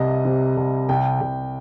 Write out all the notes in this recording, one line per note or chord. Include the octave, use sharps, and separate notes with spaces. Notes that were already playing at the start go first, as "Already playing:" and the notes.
Already playing: C2 C3 D#5
C3
C2
C2 G5
C2